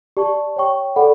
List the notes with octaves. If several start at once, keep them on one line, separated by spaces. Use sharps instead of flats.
G4 D5 A5 C#6
C#5 G5 C#6
A4 D5 F#5 B5